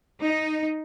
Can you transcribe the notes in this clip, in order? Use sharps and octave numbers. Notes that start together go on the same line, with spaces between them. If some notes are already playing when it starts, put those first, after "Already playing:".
D#4